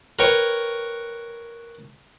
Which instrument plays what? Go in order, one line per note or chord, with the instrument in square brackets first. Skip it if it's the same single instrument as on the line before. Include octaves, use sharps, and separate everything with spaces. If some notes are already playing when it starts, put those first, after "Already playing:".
[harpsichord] A#4 B4 C#5 G5 C#6